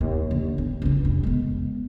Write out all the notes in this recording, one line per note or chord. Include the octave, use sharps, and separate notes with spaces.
D#2
D3
B3
C#2 D3
F1
G#3 B3